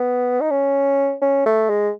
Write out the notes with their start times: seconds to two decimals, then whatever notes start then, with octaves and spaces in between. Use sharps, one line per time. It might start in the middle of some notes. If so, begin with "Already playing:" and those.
Already playing: B3
0.41 D#4
0.51 C#4
1.22 C#4
1.46 A3
1.70 G#3